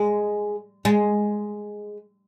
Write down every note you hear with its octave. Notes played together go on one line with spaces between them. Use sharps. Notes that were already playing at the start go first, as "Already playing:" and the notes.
Already playing: G#3
G#3